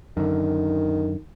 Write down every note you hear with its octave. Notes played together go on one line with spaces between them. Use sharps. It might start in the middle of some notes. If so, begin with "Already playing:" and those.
F#2 D3 D#3